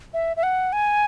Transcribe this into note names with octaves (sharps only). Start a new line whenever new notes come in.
E5
E5
F#5
G#5